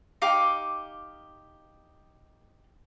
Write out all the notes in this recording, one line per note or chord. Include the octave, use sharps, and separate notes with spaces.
D#4 G4 F5 D6